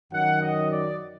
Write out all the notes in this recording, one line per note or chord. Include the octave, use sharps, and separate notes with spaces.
F#2 D#3 F#3 F#5
D#5
D5